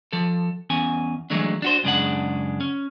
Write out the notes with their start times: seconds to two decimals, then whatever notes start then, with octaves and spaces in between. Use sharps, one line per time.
0.13 F3 A4
0.70 E2 C#4 G#5
1.30 E3 F#3 G#3 A3 D4
1.62 D4 F#4 C5
1.84 F#2 C#3 G#3 D4 G#4 F#5
2.61 C#4